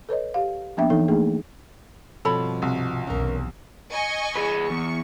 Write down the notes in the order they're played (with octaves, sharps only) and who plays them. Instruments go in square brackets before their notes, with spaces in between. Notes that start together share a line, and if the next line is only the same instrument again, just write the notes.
[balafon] A4 B4 C#5 D#5
G4 F5
F3 A#3 B3 D4 E5 G5
E3 D#4 A4
A3 A#3 D4 D#4 G#4
[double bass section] G2 [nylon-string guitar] B2 F3 C4 [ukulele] A4 C#5 B5
[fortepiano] C2
[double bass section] B1 E2 B2 [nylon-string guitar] C#4 A#4
[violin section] D#5 G#5 C#6
[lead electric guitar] G#4 B4
[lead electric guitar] E2 [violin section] C#6